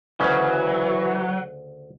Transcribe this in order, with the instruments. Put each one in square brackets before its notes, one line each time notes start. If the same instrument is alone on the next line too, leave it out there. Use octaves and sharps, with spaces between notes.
[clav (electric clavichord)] D2 C#3 C#4 [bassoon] E3 [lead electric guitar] F#3